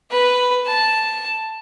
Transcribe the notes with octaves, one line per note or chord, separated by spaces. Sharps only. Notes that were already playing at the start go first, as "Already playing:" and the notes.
B4
A5